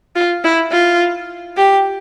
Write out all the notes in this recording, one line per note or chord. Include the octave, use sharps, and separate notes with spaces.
F4
E4
F4
G4